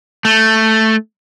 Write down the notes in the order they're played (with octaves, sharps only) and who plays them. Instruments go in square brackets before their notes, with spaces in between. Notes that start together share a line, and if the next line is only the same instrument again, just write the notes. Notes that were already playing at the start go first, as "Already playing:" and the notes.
[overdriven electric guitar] A3